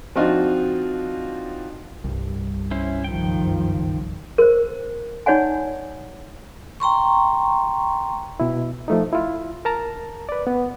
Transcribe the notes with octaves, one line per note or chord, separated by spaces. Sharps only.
F3 C4 D4 D#4 F4 F#4
C2 G2
C#4 E4 C5
F#1 D#3 F3 G5
A#4 C5
D#4 C#5 D5 F#5 G#5
G5 A#5 C6 C#6
B2 E4
F3 A3 D#4
E4 F4
A#4 A5 A#5
B4 D5
B3